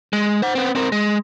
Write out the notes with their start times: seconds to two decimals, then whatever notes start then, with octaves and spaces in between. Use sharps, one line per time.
0.13 G#3
0.42 C5 F#5
0.55 B3 C4
0.75 C4 A#4
0.92 G#3